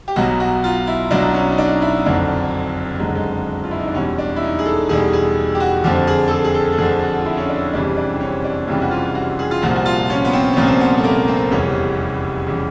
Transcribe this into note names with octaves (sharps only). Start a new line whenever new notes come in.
G4
B1 B2 F#3 F#4
F#4
F4
E4
B1 B2 F#3 D4
C#4
D#4
D4
E4
F#1 F2 D3 F#3 D4
F#1 F2 D3 F#3 G#3
G#3
F4
E4
D#4
D4
E2 B2 G3 C#4
D4
E4
D#4
G#4
A4
E2 B2 G3 G#4
G#4
G4
F#4
F2 D3 F3 G4
G#4
A4
G#4
G#4
A4
A4
F2 D3 F3 G#4
F#4
F4
E4
C#4
D4
F1 F2 C#3 E3 G3 D4
D4
C4
C#4
D4
F1 F2 C#3 E3 G3 G4
F#4
F4
F#4
G#4
F4
C2 A#2 F3 F#4
F#4
F4
C#4
B3
C4
C2 A#2 F3 C#4
C4
B3
A3
A#3
C4
F1 E2 C#3 E3 G3 C#4
C#3 E3 G3